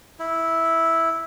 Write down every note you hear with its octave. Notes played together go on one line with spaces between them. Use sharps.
E4